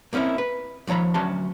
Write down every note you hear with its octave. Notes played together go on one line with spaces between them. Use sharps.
A#3 C4 C#4 D#4 E4
B4
D#2 F3 C#5 A#5 B5
D2 F#3 C#4 F#4 A5 C6